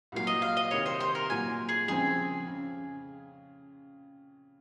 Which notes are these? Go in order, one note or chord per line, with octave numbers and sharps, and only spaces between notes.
C2 A#2 F#3 F5
D#5
F5
D#5
C2 C3 D#3 C#5
C5
C5
A#4
C2 A#2 F#3 G#5
G#4
F2 C#3 F3 C4 G#4
C#3